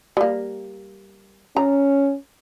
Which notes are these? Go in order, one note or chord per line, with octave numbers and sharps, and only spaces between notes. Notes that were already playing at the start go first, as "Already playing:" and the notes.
G3 A#3
C#4 A#5